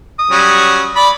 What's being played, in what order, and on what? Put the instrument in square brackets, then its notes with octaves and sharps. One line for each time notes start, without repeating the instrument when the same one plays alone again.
[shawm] D#6
[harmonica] F#3 G3 C#4
D5 B5